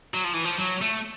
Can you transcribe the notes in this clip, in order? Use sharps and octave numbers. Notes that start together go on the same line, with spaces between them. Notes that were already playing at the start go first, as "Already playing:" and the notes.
F#3
F3
E3
F3
F#3
A3